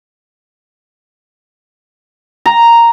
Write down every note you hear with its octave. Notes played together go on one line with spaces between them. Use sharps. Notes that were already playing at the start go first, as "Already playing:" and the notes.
A#5